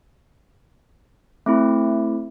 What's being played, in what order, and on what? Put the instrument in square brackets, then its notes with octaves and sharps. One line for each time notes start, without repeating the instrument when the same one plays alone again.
[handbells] A3 C4 E4